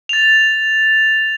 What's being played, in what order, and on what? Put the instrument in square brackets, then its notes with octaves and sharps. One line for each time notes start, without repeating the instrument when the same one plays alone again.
[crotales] A6 F7